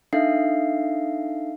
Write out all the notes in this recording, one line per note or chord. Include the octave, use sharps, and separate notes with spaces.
D4 D#4 A4 E5 F5 C7